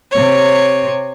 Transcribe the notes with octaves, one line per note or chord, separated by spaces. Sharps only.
C3 C#5